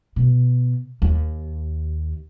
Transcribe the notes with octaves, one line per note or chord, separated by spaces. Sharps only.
B2
D#2